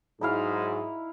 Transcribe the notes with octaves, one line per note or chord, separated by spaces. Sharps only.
G#2 F#3 D#4 E4 F5